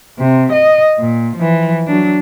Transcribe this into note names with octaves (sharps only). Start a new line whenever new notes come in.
C3
D#5
A#2
E3 F3
F#3 D4